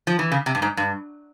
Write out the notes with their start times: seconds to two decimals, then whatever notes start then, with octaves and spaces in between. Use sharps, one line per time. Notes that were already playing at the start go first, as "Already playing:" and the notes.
0.07 F3
0.19 E3
0.32 C#3
0.46 C3
0.55 G2
0.62 G#2
0.77 G2